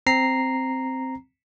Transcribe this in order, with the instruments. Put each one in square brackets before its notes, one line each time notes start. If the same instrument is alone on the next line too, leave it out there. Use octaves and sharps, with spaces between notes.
[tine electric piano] C4 A#5 C7